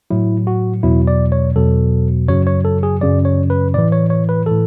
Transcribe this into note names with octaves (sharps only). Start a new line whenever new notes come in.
A2 F#3 E4
F#4
E2 B2 F#3 E4
D5
C#5
E2 B2 F#3 A4
F#2 C#3 F#3 C#5
C#5
A4
G#4
F#2 C#3 F#3 D5
C#5
B4
A2 E3 D5
C#5
C#5
B4
A2 E3 A4